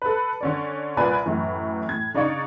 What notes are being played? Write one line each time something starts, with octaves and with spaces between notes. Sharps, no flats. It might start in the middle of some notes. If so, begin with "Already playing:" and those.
A4 B4
D3 C#4 D5
C2 A#2 A#3 B4 D5 G#5
F#2 A2 E3
A2 G#6
C#3 D4 D#4 D5 F5 C#6